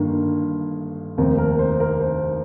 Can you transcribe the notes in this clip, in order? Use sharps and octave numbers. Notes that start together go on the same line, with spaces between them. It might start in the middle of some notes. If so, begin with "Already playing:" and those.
Already playing: G1 G2 D#3 A#3
F1 D#2 D#3 C4
A#4
C5
A#4
C5